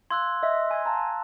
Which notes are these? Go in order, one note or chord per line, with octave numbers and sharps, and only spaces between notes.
F5 C6 E6 F#6 G#6
D#5 E5 E6
G#5 C6 G#6
F5 A5 A#5